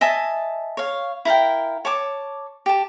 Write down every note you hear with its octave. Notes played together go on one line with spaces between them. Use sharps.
D#5 E5 G#5 A5
C#5 F5
E4 A#4 F5 G5
C#5 A5 D6
G4 A5